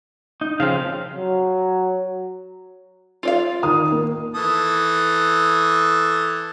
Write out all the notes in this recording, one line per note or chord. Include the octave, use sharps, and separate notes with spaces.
D#4
C#3 F3 C4 F5
F#3
F4 D5 F5
D#3 D#6
A#3
E3 A4 D#6